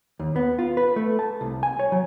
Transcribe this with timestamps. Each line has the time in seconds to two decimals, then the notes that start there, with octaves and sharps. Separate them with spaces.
0.19 D#2
0.36 B3
0.59 F4
0.77 B4
0.96 A3
1.19 A5
1.41 C2
1.63 G#5
1.79 C#5
1.92 F#3